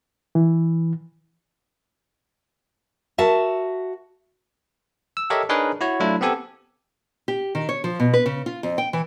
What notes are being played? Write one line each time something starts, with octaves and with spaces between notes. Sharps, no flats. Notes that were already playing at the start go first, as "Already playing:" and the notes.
E3
F#4 A#4 E5 A5
E6
G4 A4 A#4 C#5 D#5 E5
D4 D#4 G#4 A#4 B4 C#5
E4 F#4 C#5
F#3 A3 D4 E4 F4
B3 C4 G4 A4 G#5
G4
D#3
C#5
F3
B2
B4
C#3
F4
F2
G5
E3